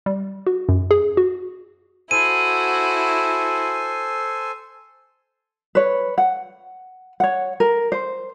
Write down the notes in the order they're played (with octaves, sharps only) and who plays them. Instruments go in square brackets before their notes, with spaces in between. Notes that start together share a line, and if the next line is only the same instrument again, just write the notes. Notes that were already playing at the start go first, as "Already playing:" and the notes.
[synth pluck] G3
F#4
F#2
G#4
F#4
[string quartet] E4 F#4 [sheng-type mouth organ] A4 C5 G#5 [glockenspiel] D#7
[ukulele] B4 C#5
F#5
C#5 F#5
A#4
C5